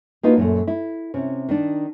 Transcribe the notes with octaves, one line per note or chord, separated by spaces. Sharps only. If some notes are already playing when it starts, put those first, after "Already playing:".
A#3 D4 D#4 F4 F#4 B4
F#2 A#2 A3
E4
C3 C#4
D#3 D4